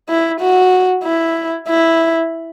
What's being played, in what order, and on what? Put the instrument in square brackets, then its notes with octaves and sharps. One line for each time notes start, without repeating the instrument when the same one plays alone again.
[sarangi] E4
F#4
E4
E4